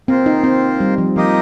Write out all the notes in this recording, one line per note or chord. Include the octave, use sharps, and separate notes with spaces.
A#3 C4 F4 C5
D#4
C4
G3
F3
F3 A#3 D#4 G4 D#5